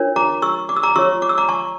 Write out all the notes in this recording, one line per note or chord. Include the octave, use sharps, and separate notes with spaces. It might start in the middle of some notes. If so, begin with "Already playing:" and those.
Already playing: D4 F4 A#4 C#5
A#5 D6
C#6 E6
D6
E6
A#5 D6
F4 C#5 C#6 E6
D6
E6
A#5 D6
A5 C#6